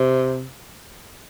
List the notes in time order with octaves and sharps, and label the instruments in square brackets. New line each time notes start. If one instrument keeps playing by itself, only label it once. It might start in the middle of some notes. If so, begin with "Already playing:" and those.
Already playing: [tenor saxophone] C3